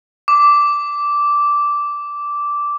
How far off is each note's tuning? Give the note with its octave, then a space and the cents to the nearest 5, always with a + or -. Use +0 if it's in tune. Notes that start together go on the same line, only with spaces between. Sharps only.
D6 -10